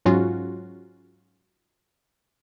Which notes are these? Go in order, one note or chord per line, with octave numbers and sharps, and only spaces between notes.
G#2 F#3 C#4 F4 F#4